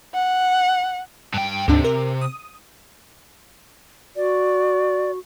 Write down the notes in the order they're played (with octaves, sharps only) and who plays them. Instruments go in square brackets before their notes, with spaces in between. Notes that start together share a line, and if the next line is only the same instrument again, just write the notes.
[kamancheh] F#5
[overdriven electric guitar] G2 G5
[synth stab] D2 G#2 D4 [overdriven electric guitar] C3
[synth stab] A#4
D#6
[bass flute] F#4 [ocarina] D5